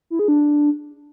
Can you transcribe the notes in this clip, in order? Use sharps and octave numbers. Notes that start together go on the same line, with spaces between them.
E4
G#4
D4